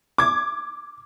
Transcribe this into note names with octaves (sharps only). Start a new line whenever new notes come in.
D6 G#6